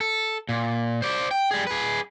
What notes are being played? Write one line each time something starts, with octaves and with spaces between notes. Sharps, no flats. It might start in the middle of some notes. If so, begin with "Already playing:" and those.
A4
A#2
C5 D5
G5
G3 G#4
G#4 B4